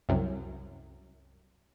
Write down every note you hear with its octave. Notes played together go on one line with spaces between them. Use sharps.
C2 F#2